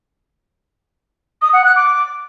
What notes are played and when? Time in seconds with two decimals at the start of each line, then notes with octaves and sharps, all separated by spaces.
1.42 D#6
1.53 F#5
1.64 F#6
1.76 D6